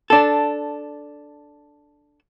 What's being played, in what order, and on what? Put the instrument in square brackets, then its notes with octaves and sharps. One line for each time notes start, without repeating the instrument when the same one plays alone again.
[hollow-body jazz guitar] D4 A4